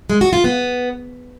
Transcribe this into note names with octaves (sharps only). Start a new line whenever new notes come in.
G#3
F#4
F4
B3